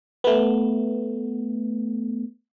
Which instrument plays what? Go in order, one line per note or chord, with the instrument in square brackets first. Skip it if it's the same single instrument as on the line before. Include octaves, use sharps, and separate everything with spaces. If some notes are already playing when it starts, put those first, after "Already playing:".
[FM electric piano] A3 B3